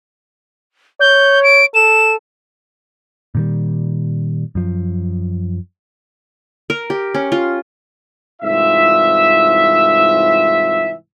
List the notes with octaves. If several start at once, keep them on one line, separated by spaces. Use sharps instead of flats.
C#5 G6
D7
A4 E7
A#2 D#3 G3
F#2 F3
A#4
G4
C#4
F4
C2 G#2 E3 F4 E5